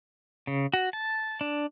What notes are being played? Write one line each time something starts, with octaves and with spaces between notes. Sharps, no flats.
C#3
F#4
A5
D4